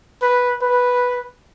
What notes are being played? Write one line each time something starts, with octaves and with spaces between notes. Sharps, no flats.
B4
B4